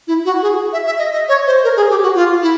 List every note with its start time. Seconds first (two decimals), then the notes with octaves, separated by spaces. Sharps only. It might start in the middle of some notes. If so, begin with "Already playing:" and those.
0.07 E4
0.25 F#4
0.42 G#4
0.73 E5
0.86 E5
0.99 D#5
1.12 D#5
1.29 C#5
1.46 C5
1.64 A#4
1.77 G#4
1.90 G4
2.03 F#4
2.15 F4
2.42 E4